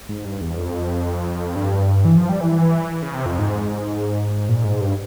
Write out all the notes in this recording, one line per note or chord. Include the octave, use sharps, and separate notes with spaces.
G#2
G2
E2
F2
G2
E3
F3
G3
E3
C#3
C3
F2
G#2
A#2
G#2
G2